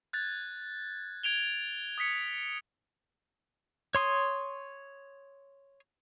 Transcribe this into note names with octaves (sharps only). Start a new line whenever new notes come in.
F#6 G#6 A6
G#6 D7 F7 G7
D#6 G#6 B6 C#7
C#5 C6 D#6